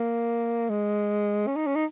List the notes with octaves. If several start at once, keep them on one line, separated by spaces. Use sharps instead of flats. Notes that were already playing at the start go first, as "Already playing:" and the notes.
Already playing: A#3
G#3
C#4
D#4
C#4
D#4